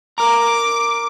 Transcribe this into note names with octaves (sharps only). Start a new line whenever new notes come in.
A#4 A#5 D6